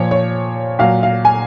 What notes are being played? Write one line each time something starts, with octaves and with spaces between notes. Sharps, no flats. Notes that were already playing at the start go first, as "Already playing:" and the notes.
Already playing: A#2 F3 C#5
C#5
A#2 F#3 F5
F5
G#5